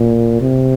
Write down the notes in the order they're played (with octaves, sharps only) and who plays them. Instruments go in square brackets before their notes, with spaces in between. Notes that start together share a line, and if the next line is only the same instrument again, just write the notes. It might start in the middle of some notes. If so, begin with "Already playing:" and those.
Already playing: [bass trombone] A#2
C3